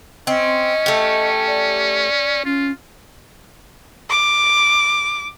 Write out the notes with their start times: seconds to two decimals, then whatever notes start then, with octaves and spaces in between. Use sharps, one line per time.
0.27 C4 C#4 D#5
0.86 A3 G4
1.47 D5
2.45 C#4 F4
4.10 D6